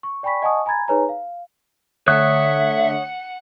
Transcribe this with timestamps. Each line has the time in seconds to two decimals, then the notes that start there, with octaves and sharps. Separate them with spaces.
0.03 C#6
0.23 D5 G5 G#5 B5 C#6 B6
0.42 D#5 F#5 G#5 A5 C#6 D#6
0.66 G#5 A#5 B5 G#6 A6
0.88 D#4 G#4 B4 C#5 G#5 A#5
1.09 F5
2.08 D3 A3 C#5 E5 F#5 D#6 F#6 C#7